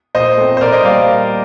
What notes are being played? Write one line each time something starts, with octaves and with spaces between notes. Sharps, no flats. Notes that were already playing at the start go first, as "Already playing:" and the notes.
A#2 C5 D#5
A3 C4
C5
A#2 A#4 D5
C5 D#5
G3 A#3 D5 F5